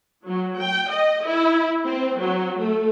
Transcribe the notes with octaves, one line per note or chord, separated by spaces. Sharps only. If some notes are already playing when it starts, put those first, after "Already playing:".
F#3
G5
D#5
E4
C4
F#3
A3